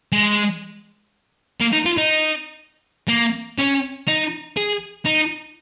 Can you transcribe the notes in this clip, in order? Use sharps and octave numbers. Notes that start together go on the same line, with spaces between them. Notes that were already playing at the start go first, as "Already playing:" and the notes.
G#3
A#3
D#4
F4
D#4
A#3
C#4
D#4
G#4
D#4